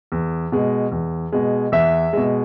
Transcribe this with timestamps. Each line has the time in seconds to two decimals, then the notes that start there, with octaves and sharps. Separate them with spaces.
0.12 E2
0.52 B2 G#3
0.92 E2
1.32 B2 G#3
1.72 E2 E5
2.13 B2 G#3